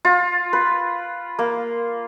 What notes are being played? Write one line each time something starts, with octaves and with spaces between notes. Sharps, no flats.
F4
B4
A#3